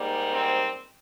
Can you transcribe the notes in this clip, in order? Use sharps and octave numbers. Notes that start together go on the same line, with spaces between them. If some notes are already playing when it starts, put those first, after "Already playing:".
Already playing: G#2 G3 A#3
C4